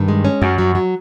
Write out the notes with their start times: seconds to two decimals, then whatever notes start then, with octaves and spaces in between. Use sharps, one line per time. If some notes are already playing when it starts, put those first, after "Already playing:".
Already playing: G2 D#3
0.08 G#3
0.25 C#4
0.42 F#2 F#3
0.58 F#3
0.75 F#3